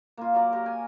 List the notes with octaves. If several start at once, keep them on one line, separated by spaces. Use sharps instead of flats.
A#3 F4
F#3 A#4 D5
G4 A#4 C#5
G#5